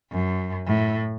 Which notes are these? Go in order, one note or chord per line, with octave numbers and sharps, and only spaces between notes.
F#2
A2